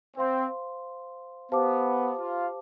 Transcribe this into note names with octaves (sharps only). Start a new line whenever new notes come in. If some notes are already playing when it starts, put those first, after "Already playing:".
C4 C5 F5 C6
B3 G4 C5 F5 A5 D6
F4